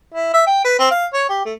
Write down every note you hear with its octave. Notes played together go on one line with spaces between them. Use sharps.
E4
E5
G5
B4
C4
F5
C#5
G4
A3